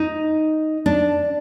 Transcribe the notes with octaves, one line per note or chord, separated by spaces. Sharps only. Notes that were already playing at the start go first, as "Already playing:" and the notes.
Already playing: D#4
D4